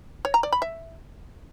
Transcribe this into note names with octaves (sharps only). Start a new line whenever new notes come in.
C#5
A#5
D5
B5
E5